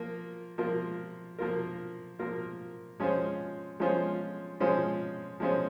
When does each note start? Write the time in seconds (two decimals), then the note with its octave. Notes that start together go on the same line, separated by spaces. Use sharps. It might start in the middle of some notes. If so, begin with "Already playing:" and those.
Already playing: F3 A#3 F4 A#4
0.58 F3 A#3 F4 A#4
1.39 F3 A#3 F4 A#4
2.19 F3 A#3 F4 A#4
3.00 F3 G#3 C#4 F4 C5
3.80 F3 G#3 C#4 F4 C5
4.60 F3 G#3 C#4 F4 C5
5.40 F3 G#3 C#4 F4 C5